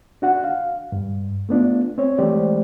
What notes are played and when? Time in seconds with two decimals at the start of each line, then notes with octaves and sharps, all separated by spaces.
0.22 D4 F#4 F#5
0.44 F5
0.92 G2
1.49 A3 B3 D4 F4
1.98 C4 C#5
2.18 E3 G#3 A3 G4 C5 D5